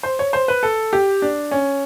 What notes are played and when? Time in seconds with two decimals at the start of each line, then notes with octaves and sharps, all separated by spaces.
0.03 C5
0.19 C#5
0.33 C5
0.48 B4
0.63 A4
0.93 G4
1.22 D4
1.51 C#4